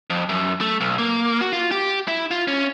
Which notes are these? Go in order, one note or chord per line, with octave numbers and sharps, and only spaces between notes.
F2
F#2
A3
B1
A#3
F#4
F4
G4
E4
F4
C#4